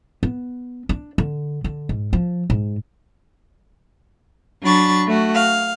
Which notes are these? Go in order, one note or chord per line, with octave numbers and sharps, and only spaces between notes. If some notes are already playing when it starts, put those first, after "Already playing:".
B3
D4
D3
D3
G#2
F3
G#2
F#3 D4 B5 C#6 A6
A3 F#4
F5